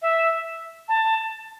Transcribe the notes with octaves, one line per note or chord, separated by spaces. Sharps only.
E5
A5